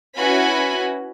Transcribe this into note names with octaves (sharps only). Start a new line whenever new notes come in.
C#4 E4 F#4 B4 G#5 B5